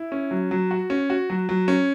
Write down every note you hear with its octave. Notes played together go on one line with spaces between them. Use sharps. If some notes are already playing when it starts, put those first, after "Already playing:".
Already playing: E4
C#4
F#3
F#3
F#4
C#4
F#4
F#3
F#3
C#4